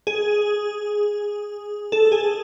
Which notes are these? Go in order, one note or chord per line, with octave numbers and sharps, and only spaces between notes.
G#4
A4
G#4